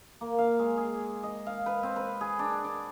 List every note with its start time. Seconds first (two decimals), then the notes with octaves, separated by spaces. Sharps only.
0.21 A#3
0.38 F5
0.59 G#3
0.77 G#4
1.23 D#5
1.46 F5
1.66 B4
1.83 C4
1.96 B4
2.21 G#4
2.39 D4
2.64 D5